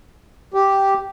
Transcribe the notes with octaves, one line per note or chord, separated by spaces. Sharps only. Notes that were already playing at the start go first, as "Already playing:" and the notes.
G4